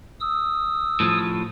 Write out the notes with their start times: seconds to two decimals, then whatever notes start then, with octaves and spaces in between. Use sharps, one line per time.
0.20 D#6 E6
1.00 A2 F3